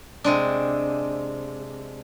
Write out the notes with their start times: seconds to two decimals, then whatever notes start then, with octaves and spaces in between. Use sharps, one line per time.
0.24 C3 G#3 D4